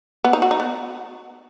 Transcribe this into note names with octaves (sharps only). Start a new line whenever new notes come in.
B3
D#4
F#4
D#4
B3